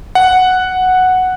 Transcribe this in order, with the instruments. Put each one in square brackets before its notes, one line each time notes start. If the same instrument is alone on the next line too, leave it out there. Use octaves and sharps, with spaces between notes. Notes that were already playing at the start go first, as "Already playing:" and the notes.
[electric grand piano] F#5